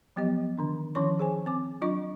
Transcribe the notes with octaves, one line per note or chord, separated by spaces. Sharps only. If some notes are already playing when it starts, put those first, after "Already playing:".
F3 F#3 B3 G4 D#5
D3 D#3 D4
D#3 F3 C#4 E4 C#5 C#6
G#4 C5 G#5
C4 D6
F#3 D4 F4 D#5 C#6